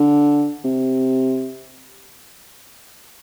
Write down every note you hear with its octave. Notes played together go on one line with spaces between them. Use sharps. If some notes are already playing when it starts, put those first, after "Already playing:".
Already playing: D3
C3